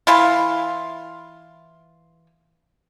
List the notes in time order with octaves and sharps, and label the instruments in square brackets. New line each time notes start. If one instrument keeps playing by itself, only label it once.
[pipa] E3 E4 F4